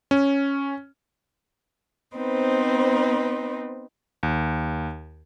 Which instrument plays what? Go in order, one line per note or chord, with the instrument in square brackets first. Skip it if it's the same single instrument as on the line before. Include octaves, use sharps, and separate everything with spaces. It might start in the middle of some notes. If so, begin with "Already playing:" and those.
[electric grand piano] C#4
[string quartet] B3 C4 D#4 B4 C5
[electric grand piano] D#2